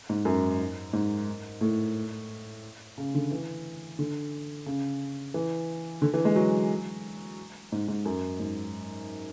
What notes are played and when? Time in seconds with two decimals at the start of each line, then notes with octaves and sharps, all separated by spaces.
0.09 G#2
0.25 F#2
0.93 G#2
1.61 A2
2.98 C#3
3.14 D3
3.31 E3
3.99 D3
4.66 C#3
5.34 E3
6.02 D3
6.14 E3
6.25 G#3
6.36 F#3
7.72 G#2
7.88 G#2
8.05 F#2
8.40 G#2